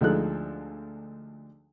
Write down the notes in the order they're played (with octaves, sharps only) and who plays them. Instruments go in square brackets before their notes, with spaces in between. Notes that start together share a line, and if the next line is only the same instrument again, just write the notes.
[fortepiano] D2 F3 G#3 D#4 A4 F#6